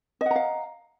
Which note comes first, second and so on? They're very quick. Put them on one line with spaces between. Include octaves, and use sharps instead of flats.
D#5 F#5 A#5 F5